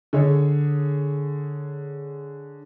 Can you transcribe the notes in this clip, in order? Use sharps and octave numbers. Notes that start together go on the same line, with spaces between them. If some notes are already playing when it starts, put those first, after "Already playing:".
D3 G#4 C#5